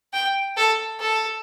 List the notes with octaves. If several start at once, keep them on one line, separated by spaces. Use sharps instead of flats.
G5
A4
A4